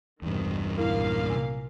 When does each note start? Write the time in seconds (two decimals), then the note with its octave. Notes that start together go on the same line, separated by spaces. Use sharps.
0.22 B1 E2 G2 C3 D#3
0.78 B1 A#2 A#3 E4 F5
1.30 C3 G#5